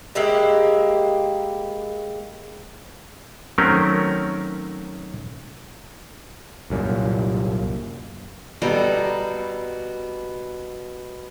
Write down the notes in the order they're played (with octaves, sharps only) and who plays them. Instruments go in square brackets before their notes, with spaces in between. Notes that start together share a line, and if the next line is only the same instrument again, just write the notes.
[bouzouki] G#3 A#3 E4 G4
[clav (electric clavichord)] D#3 F#3 A3 C4 C#4 A#4
[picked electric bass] C2 F#2 A#2
[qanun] B2 G3 A4 A#5